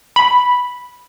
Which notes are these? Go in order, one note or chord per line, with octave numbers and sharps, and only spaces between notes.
B5